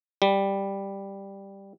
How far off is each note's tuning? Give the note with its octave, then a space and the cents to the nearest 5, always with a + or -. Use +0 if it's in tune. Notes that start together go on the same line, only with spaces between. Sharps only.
G3 +5